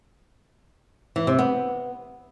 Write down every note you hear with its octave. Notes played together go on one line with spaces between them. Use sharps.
E3
C3
B3